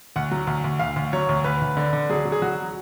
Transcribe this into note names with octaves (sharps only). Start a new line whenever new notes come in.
D2 F#5
F#3
D2
D2
D2 F5
D2
F#3 C#5
D2
D2 B4
D2
D3
D3
F#3 G#4
F#3
G#4
F#3 F#4